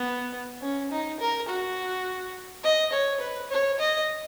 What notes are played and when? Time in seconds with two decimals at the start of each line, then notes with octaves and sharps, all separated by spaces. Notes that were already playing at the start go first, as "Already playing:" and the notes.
Already playing: B3
0.62 C#4
0.91 D#4
1.20 A#4
1.49 F#4
2.64 D#5
2.92 C#5
3.20 B4
3.50 C#5
3.79 D#5